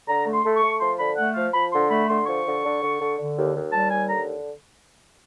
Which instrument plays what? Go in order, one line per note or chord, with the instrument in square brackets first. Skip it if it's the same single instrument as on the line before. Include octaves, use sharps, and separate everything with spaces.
[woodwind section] D3 A#5
A3
C6
A3
C#6
A3
F3 C6
D3 B5
A3 F#5
F3 F5
F3 B5
D3 C6
A3 B5
D3 C6
F3 C#6
D3
D3
D3
D3
D3
D#2
D#2
G3 A5
D#2 G#5
D3 A#5